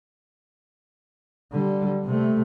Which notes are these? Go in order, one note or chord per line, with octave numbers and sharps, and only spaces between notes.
D3 G3
C3 A3